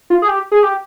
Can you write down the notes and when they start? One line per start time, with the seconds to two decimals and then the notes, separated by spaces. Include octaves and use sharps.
0.10 F4
0.22 G#4
0.28 G4
0.52 G#4
0.63 G4